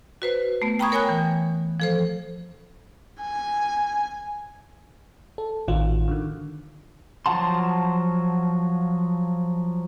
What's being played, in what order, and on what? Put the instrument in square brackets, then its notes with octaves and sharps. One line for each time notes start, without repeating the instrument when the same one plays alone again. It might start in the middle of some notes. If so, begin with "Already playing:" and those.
[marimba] F#4 B4 C5
A3 B3
G5 A#5 B5 C#6 D#6 G#6
A#4 C#5 G5 G#5 B5 F#6
E3
F3 A4 C5
[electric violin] G#5
[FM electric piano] A4
A1 D#3 F4 F#4
D3 D#3
[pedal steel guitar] F3 F#3 F#5 A5 C6